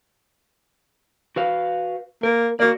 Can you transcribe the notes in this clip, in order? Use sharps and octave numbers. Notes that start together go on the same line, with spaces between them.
F#4 B4 F5
A#3 A#4
A#3 F#4 D5